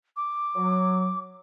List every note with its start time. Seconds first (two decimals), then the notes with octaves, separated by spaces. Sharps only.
0.16 D6
0.56 F#3